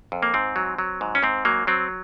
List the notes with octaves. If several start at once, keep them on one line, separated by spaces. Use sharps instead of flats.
F2
A#3
G#2 C4
F#3
F#3
G#2
C#4
G#2 C4
F#3 A#3
F#3 C4